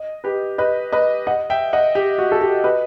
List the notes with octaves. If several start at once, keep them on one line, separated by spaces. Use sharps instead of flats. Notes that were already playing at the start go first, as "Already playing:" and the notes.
Already playing: D#5
G4 B4
B4 D#5
B4 D#5
D#5 F#5
E5 G5
D#5 F#5
G4
F#4
A4
G4
B4 D#5